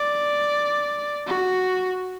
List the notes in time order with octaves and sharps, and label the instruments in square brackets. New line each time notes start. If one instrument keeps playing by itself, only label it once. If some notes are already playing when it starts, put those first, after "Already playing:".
Already playing: [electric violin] D5
F#4